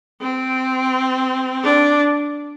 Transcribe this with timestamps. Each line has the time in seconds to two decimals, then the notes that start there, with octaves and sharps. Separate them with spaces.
0.21 C4
1.63 D4